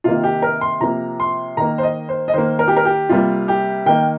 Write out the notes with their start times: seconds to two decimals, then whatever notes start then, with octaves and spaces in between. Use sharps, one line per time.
0.04 C3 D#3 A#3 F4
0.24 G4
0.42 A#4
0.61 C6
0.80 C3 F3 A#3 A#5
1.20 C6
1.57 D#3 A#3 A#5
1.78 C5
1.83 D#5
2.09 C5
2.28 D#5
2.33 D#3 A#3 C5
2.59 A#4
2.68 G4
2.76 A#4
2.85 G4
3.09 C3 G3 A#3 F4
3.48 G4
3.86 D#3 A#3 G5